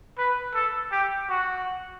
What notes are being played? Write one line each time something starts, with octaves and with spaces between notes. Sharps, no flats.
B4
A4
G4
F#4